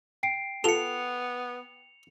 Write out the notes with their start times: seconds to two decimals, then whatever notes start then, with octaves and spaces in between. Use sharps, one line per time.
0.23 G5 C7 D7
0.64 B3 F4 A4 C#7 F7